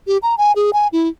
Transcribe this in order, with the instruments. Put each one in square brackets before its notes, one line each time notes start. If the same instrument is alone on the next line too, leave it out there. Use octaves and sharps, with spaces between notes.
[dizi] G4
A#5
G#5
G#4
G#5
E4